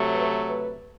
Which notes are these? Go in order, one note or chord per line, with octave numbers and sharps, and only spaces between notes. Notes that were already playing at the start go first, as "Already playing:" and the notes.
Already playing: C3 F#3 A3
B4
B4